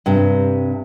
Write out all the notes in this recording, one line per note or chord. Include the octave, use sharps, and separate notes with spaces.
G2 C3